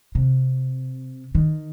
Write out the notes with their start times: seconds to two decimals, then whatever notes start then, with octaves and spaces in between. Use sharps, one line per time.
0.15 C3
1.35 D#3